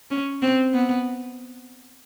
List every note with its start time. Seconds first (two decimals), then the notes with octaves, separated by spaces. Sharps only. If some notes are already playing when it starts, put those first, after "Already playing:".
0.11 C#4
0.42 C4
0.74 B3